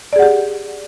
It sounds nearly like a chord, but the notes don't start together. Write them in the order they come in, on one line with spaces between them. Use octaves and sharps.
D5 G#4 F#5 G4